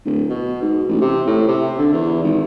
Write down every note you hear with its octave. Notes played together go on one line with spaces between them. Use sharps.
D1
B2
G#2
A1
C3
A2
C3
D3
E2
G#1